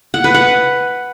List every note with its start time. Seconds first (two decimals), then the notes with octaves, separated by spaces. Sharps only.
0.14 F#5
0.24 B4
0.34 F#5